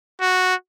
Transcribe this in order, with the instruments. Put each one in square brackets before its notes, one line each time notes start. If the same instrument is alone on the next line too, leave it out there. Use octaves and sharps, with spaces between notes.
[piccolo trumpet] F#4